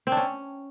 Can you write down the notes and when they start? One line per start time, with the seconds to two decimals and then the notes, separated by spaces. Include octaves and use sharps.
0.07 C4
0.12 D4
0.17 C#4